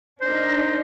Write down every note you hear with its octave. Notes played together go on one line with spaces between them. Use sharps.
D4 D#4 A#4 C5